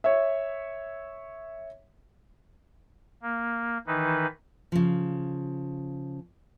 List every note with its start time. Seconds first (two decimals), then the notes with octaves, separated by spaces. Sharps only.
0.04 C#5 E5
3.22 A#3
3.87 D#3 E3 D#4 B4
4.72 C#3 F3